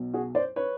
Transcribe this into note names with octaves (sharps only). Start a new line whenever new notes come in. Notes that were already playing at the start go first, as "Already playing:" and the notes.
Already playing: B1 B2 F#3
F#4 G#4
C5 D5
B4 C#5